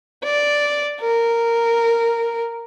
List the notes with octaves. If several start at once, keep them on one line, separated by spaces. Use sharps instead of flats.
D5
A#4